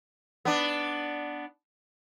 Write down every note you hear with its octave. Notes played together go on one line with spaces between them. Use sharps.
B3 D4